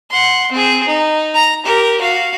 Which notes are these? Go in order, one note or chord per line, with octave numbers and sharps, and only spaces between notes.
F#5 C6
C4 G#4
D#4
A#5
G4 A#4
F#4 F5